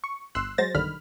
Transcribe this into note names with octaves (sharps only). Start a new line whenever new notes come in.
C#6
G1 C6 E6 F#6
F#3 G#3 C5 A6 A#6
B1 G2 D3 D#3 B5 F6